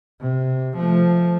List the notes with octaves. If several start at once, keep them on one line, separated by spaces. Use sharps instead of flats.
C3
F3 A3